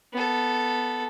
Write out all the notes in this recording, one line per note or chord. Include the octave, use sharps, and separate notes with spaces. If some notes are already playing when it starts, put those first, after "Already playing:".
B3 A4